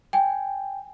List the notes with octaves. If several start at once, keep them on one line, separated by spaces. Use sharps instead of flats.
G5 G#5